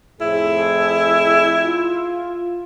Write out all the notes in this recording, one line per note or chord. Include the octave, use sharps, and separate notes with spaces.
F2 A2 E4 G#4
F4